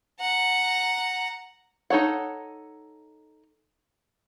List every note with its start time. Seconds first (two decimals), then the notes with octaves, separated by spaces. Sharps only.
0.20 F#5 A#5
1.90 D#4 A4 C#5 F#5